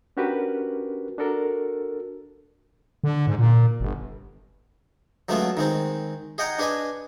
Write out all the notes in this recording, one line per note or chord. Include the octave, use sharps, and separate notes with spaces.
C#4 D4 F#4 G4 A#4 B4
D4 F#4 A4 A#4
D3
G#2
A#2
G1
F#3 G#3 A3 B3 C#4 F4
D#3 G#3 C4
G#4 D#5 F#5 G5 A#5
D4 G#4 B4 D#5 G#5